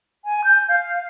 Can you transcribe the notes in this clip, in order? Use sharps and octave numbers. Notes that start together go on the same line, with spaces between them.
G#5
G6
F5